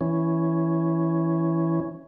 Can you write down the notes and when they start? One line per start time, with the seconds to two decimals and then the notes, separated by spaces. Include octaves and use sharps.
0.01 E3 C#4